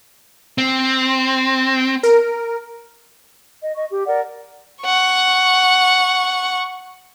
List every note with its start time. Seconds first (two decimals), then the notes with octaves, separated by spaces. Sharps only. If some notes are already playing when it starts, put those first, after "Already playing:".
0.58 C4
2.03 A#4
3.60 D#5
3.74 D#5 C#6
3.90 G4
4.05 A#4 D5 F#5
4.84 F#5 C#6